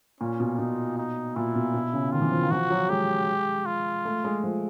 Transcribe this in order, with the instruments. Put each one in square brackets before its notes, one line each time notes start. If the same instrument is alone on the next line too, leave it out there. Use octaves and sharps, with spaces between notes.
[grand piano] A#2 [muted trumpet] C#4
[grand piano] B2
[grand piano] B2 [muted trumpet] D#4
[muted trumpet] D#4
[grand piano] A#2 [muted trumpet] E4
[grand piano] B2
B2
C#3
[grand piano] D#3 [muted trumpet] F4
[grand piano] E3
F3
D#3
[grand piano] F3 [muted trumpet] F#4
[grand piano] F#3
[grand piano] G#3 [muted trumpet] G4
[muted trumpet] F4
[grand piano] A3
G#3
F3